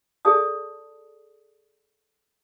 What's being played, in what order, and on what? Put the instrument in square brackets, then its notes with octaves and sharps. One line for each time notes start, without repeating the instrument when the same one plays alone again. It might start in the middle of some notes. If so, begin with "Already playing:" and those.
[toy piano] G#4 A4 D5 A5 D#6